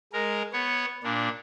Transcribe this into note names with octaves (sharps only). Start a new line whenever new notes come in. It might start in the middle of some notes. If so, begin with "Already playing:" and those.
G#3 A#4
B3 C#5
A#2 D4